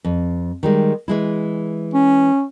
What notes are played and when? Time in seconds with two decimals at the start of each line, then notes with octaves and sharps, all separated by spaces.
0.04 F2
0.63 D#3 G3 G#3
1.08 E3 G#3 E4
1.94 C#4